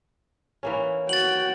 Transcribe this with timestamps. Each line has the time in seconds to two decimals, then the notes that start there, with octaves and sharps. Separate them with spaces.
0.63 E3 A#3 C#4
1.09 F#4 G5 A6 F#7